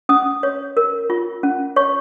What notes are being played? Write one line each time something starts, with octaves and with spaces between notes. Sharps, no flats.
C#4 D#6
C#5
A#4
F4
C#4
C#5 C#6